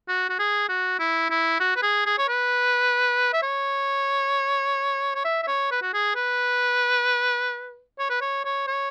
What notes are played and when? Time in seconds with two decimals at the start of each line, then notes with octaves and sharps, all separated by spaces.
0.08 F#4
0.29 F#4
0.39 G#4
0.69 F#4
0.99 E4
1.30 E4
1.60 F#4
1.76 B4
1.83 G#4
2.06 G#4
2.18 C#5
2.28 B4
3.33 E5
3.43 C#5
5.15 C#5
5.25 E5
5.43 E5
5.47 C#5
5.71 B4
5.82 F#4
5.93 G#4
6.16 B4
7.99 C#5
8.10 B4
8.21 C#5
8.45 C#5
8.67 C#5